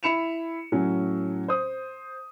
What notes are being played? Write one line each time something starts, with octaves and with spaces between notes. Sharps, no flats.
E4 B5 C#7 E7 F7
A2 F#3 C#4
C5 D#6